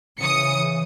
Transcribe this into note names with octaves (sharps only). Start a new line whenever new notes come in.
C#3 E3 D#6 C#7